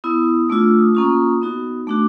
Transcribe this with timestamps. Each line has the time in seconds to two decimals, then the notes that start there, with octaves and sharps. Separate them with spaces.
0.04 B3 E4 D#6
0.49 A3 D4 F4 E6
0.64 E6
0.79 D#6
0.95 A#3 C#4 F4
1.41 B3 D#4 F#4
1.87 A3 D4 F#4 D6